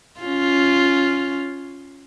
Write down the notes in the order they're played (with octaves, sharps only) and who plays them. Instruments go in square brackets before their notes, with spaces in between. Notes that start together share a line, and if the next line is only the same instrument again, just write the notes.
[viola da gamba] C#4 F4